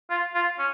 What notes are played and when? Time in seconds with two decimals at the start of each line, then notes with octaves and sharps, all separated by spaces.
0.10 F4
0.34 F4
0.59 C#4